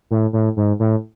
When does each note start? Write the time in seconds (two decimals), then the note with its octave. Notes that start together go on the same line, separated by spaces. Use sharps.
0.11 A2
0.33 A2
0.57 G#2
0.80 A2